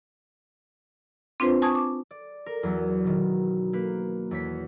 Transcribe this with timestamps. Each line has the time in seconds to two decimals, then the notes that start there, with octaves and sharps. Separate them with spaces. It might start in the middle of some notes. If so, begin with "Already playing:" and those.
1.40 C4 D4 F4 B4 C5
1.62 G#5 A5 C#6 D#6 G#6
1.75 D6
2.11 D5
2.46 A#4
2.63 E2 F#3 B3
3.04 B2 D#3
3.73 A#3 B4
4.31 E2 C#5 B6